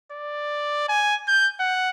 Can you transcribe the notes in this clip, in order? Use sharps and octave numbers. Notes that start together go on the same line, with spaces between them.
D5
G#5
G6
F#5